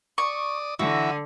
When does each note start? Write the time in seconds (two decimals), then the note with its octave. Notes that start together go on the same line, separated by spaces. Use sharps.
0.18 D5 C#6 D#6
0.79 D3 E3 E4 F#4